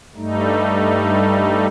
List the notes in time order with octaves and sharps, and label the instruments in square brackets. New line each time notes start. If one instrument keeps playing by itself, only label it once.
[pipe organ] G2 G3 A3 D#4